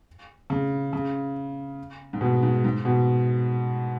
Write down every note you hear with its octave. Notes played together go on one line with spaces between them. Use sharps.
C#3
C#3
G#2
B2
G#2
G#2
B2